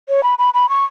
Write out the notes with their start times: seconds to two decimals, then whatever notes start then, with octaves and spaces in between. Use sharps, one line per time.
0.09 C#5
0.23 B5
0.38 B5
0.54 B5
0.69 C#6